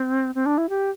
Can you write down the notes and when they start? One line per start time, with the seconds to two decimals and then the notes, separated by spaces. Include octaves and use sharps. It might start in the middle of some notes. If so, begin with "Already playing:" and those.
Already playing: C4
0.35 C4
0.46 D4
0.58 E4
0.69 G4